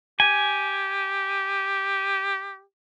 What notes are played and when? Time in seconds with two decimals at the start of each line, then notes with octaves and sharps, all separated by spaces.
0.20 G4 G#5